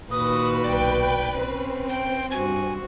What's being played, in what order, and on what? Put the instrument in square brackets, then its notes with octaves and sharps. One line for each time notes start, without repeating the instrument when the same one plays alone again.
[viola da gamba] A#2 D#3 F#4 [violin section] B4 [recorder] D#6
[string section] B1 G5 [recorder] D5
[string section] C4 [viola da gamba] C#4
[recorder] G5
[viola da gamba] G2 F#4 [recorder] G#5